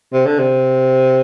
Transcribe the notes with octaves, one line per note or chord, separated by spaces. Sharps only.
C3
D3
C3